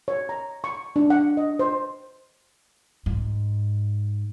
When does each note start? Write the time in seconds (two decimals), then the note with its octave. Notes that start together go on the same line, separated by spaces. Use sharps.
0.08 C#5
0.29 A#5
0.64 C#6
0.96 D4
1.10 F#5
1.37 D#5
1.59 C5
3.06 G#2